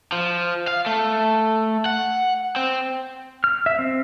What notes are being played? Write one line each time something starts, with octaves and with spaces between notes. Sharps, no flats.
F3
F5
A3
F#5
C4
F6
E5
C4